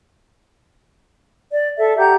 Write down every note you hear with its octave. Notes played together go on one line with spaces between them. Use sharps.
D5
A4 E5
G4 F#5 A#5 G6